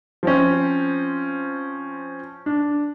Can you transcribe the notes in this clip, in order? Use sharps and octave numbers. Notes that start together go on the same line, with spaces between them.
F3 C4 C#4
D4